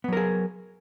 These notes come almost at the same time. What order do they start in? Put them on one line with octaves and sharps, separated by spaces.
B3 F#3 A#4 G#4